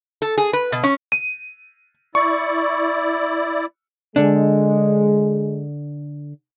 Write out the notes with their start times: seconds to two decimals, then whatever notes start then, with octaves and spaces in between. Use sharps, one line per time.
0.22 A4
0.38 G#4
0.53 B4
0.72 B2
0.84 C#4
1.12 D#7
2.15 E4 D5 C#6
4.16 D3 G#3 D4